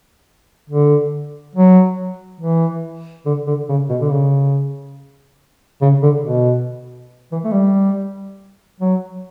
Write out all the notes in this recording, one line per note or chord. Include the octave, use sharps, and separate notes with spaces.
D3
F#3
E3
D3
D3
C#3
B2
D3
C#3
C#3
D3
B2
E3
A3
G3
F#3